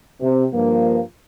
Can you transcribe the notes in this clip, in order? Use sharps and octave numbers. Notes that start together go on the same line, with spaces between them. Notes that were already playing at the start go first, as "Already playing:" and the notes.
C3
G2 F3 A#3